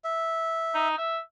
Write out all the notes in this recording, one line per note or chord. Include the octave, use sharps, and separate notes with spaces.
E5
D#4
E5